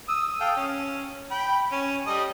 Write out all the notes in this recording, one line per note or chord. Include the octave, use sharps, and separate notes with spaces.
D#6 E6
A4 F5 G5
C#4
G5 B5
C#4
G3 A4 D#5